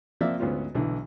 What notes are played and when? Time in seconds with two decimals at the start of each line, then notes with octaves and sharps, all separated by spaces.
0.21 F3 A#3 C4 D5 E5
0.40 D2 G#2 B3 C#4 F4
0.75 B1 D3 E3